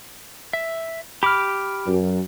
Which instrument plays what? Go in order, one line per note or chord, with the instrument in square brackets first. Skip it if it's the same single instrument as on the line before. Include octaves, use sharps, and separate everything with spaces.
[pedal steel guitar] E5
[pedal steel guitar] G4 D6 [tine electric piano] B5 F6
[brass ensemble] F#2